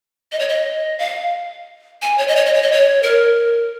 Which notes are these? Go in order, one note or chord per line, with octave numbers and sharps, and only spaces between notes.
D#5
C#5
D#5
F5
G#5
C#5
D#5
C#5
D#5
C#5
D#5
C#5
A#4